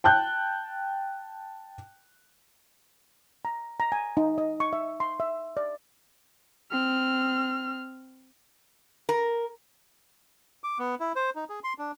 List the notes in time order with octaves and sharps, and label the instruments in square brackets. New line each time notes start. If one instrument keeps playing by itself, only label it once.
[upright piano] G5 A5 F#6 G6
[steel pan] A#5
A#5
G#5
D#4
D#5
C#6
E5
C6
E5
D5
[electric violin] C4 F6
[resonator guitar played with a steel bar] A#4
[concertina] D6
B3
E4
C5
D#4
G#4
C6
D4